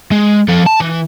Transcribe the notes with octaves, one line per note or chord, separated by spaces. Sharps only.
G#3
F3 A4
A5
E3